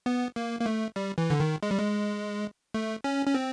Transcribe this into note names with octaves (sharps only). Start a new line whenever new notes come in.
B3
A#3
A#3
A3
G3
E3
D3
D#3
G#3
G3
G#3
A3
C#4
C#4
C4